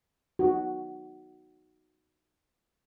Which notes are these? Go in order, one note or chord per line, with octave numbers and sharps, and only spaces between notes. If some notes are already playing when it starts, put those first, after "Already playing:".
D#4 F#4